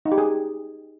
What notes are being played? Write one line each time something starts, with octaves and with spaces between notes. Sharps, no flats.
D#4
G4
G#4